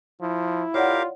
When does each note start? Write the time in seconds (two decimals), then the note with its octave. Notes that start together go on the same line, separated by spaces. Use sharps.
0.21 F3 E4
0.74 F4 G4 A#4 C#5 D5 F5 F#5